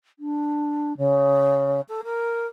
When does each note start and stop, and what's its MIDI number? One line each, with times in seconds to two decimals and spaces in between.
0.19 0.97 62
0.98 1.81 49
1.89 2.01 69
2.04 2.47 70